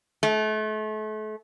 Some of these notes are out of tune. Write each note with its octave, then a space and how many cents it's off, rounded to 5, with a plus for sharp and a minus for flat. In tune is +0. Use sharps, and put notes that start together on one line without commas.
A3 -35